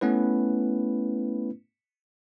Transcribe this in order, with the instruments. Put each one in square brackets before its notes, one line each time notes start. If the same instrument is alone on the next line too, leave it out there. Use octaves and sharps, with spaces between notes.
[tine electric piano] A3 B3 C#4 E4 B4